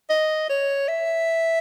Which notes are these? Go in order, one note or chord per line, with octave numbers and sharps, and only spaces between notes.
D#5
C#5
E5